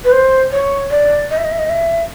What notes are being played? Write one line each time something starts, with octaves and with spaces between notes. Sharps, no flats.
B4
C5
C#5
D5
D#5
E5
D#5
E5
D#5
E5